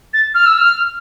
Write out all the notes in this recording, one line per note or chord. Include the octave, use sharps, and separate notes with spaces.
A6
F6
E6
F6